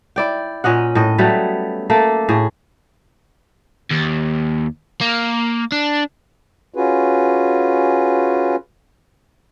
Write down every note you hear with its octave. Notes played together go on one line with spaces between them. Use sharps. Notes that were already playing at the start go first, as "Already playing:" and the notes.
E4 D5 G5
A#2 C#4 D#5 F#5
A2 D#5
F#3 G3 A3 B3
A3 A#3 A4
A2 G#4
D#2
A#3
D4
C#4 F4 F#4 G#4 B4